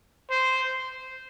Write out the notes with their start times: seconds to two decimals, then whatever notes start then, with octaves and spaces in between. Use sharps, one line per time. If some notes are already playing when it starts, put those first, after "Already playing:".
0.30 C5